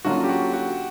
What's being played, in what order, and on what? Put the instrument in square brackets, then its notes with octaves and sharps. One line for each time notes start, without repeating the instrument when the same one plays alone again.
[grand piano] D3 F#3 A#3 C#4 F4 [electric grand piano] F#4
[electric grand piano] G4
F#4
F#4